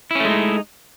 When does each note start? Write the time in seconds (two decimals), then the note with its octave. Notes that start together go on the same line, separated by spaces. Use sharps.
0.11 E4
0.15 C#4
0.20 A3
0.25 G#3
0.29 D#4